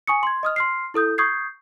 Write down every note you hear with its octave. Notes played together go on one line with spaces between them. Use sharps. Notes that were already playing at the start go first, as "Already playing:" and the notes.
G#5 C#6 D#6 C#7
C6 G#6
D#5 D#6 F6
C6 F6 C7
E4 A4 D#6 G6
C#6 D#6 G6 G#6 C7